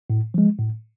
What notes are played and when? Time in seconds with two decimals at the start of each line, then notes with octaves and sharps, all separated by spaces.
0.10 A2
0.34 F3 G#3
0.59 A2